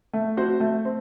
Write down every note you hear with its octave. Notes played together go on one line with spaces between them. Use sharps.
A3
C4 F#4 C5
A3
C4